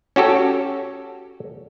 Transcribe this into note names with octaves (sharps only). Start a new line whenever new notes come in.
C#4 F#4 G4 A4